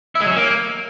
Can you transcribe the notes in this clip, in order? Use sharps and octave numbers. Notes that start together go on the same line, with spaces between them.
E4
G#3
F#3
C#4
A#3